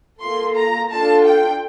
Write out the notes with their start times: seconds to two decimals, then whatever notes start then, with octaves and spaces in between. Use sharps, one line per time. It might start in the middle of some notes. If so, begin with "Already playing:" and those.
0.20 A#3 F4 A4 C6
0.56 A#5
0.90 D4 F4 A4 A5
1.25 G5